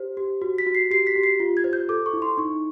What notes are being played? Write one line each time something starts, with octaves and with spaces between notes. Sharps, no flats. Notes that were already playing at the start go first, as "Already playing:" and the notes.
Already playing: G4 C5
G4
F#4
B6
F#4
C7
G4 C7
B6
G4
C7
F4
G#6
C5
G6
A4 D6
C#6
E4
C6
D#4 C#6